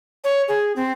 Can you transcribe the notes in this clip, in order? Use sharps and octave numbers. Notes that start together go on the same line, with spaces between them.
C#5
G#4
C4